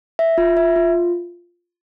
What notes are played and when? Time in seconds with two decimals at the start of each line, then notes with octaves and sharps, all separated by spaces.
0.19 E5
0.38 F4
0.57 E5
0.76 F4